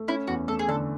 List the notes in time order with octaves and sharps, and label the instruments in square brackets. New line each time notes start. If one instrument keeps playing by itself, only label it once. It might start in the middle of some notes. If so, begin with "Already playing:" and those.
Already playing: [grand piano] A3
[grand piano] C#4 [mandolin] E4
[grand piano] E2 [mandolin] F#4
[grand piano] A3 [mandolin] A4
[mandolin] G#4
[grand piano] D3 [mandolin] A4